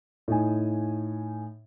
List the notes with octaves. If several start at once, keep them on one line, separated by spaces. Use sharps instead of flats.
A2 D#4 G#5